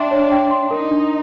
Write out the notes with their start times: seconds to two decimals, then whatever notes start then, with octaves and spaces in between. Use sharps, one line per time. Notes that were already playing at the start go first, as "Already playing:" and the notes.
Already playing: D4 E5 G5 C6
0.11 C#5
0.32 G5
0.51 C6
0.71 D#4 A#4
0.91 D4